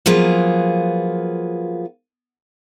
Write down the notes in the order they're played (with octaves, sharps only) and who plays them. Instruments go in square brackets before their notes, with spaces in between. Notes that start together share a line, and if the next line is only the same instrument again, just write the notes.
[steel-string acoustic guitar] F3 F#3 A#3 B3 F4 G#4